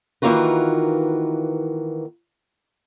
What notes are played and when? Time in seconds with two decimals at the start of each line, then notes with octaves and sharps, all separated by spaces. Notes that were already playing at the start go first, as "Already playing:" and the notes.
0.22 D#3 E3 A#3 F4 F#4 B4